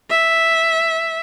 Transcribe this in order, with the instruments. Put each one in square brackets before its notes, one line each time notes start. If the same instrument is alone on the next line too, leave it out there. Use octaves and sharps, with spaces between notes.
[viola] E5